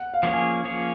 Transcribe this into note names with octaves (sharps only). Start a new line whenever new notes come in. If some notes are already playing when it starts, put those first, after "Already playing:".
Already playing: F#5
F5
F3 A#3 C#4 G#4 C#5
G#5
F3 A#3 C#4 G#4 C#5